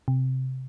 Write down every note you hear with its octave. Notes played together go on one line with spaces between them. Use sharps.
C3